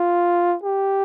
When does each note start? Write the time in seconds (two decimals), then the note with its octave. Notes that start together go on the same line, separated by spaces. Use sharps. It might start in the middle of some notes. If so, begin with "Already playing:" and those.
Already playing: F4
0.63 G4